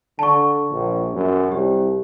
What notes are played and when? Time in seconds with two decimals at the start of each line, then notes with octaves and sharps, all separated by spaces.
0.19 D3 A5 C#6
0.71 A#1
1.14 F#2
1.52 C2 G4